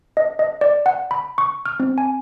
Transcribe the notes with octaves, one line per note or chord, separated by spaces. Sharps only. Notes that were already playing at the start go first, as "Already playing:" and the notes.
D#5
D#5
D5
F#5
B5
C#6
F6
C4
G#5